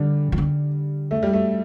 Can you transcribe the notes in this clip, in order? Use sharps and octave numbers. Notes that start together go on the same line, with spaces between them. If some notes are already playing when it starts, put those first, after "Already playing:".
Already playing: D3 G3
E3
D3
A3
G3
A3